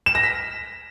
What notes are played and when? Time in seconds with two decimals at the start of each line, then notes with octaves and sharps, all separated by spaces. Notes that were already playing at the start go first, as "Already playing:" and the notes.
0.06 E7
0.15 A#6
0.23 B6